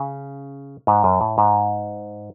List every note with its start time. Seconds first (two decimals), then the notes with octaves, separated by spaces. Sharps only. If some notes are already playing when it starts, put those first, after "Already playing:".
Already playing: C#3
0.87 G#2
1.04 F#2
1.21 A2
1.38 G#2